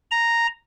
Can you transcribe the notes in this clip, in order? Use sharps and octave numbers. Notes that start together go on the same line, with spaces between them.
A#5